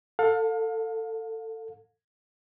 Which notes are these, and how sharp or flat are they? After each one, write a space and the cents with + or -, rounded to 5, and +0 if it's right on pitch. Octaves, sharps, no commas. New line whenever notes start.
A4 +20 F5 +35